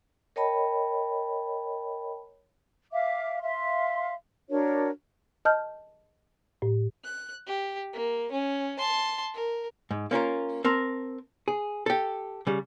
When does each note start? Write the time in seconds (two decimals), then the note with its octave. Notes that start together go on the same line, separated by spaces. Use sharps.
0.36 A#4 C#5 D#5 G5 A5 B5
2.92 E5 F5 D6
3.42 E5 F5 C6
4.49 D4 F#4 A#4 C#5
5.45 D#5 A5 F6 G6
6.62 A2
7.04 F#6
7.47 G4
7.93 A#3
8.32 C#4
8.78 A5 C6
9.34 A#4
9.91 G#2
10.11 A#3 C#4 F4 A#4
10.64 C4 A#4 A5
11.48 G#4
11.86 G4 A4
12.47 C#3 G3